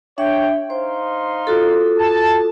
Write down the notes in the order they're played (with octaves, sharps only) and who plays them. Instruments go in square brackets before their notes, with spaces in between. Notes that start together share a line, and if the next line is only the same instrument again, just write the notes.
[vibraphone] D4 E5 [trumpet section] C#5 G5
[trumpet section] D#4 F5 C6 [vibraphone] C5
[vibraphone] F4 F#4 A4
[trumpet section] A5